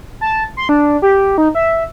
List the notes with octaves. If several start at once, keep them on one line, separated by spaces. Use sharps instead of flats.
A5
C6
D4
G4
D#4
E5